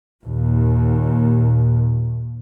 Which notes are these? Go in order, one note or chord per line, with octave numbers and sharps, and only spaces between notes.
D#2 A#2